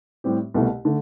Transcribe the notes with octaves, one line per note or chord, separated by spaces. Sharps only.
A2 G3 C4 G4
C2 B2 A3 E4
D3 A3